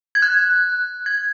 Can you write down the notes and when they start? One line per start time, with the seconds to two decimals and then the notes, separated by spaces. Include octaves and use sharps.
0.15 G#6
0.22 F#6
1.06 G#6